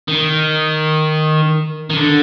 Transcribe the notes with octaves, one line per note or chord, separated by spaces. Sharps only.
D#3
D#3
D3